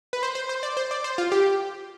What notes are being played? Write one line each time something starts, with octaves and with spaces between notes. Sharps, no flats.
B4
C5
C5
C5
D5
C5
D5
C5
F4
G4